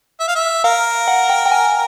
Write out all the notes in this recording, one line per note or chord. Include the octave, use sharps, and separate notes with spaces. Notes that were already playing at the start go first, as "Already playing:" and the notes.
E5
F5
E5
A#4 F5
F#5
G5
G5
G#5